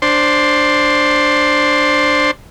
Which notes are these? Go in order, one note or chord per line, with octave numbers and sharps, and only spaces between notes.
D4 C5